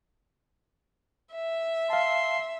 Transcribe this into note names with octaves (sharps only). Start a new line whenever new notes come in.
E5
F5 A5 C6